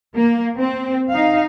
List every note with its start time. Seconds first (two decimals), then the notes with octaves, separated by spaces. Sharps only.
0.16 A#3
0.59 C4
1.09 D#4 F5